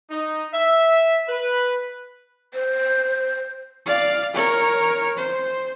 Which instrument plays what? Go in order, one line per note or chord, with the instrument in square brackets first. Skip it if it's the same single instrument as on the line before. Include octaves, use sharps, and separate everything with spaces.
[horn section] D#4
E5
B4
[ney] C5
[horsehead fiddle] D5 F5
A#4 C#5
C5